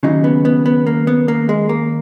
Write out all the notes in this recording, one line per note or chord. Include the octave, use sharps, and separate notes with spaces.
D#2 C#3 F#3 D#4
B3
B3
B3
A#3
B3
A#3
G#3
A#3